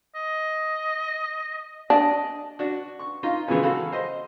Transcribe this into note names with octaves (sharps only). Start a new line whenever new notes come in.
D#5
D4 D#5
D4 F#4
C#6
D#4 F4 D#5
C#3 E3 F3 G#3 B3 C#4
F#4 A4 F5 B5
C5 D#5 C6